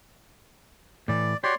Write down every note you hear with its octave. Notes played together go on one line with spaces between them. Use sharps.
A2 E3 D5
F#4 G4 C#5 D5 C6